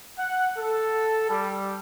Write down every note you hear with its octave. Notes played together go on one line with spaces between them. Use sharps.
F#5
A4
G3